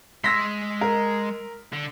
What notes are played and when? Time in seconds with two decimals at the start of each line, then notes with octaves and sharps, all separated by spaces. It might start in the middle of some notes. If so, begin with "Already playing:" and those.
0.24 G#3 C6 E6 A#6 B6
0.81 A#4
1.73 D3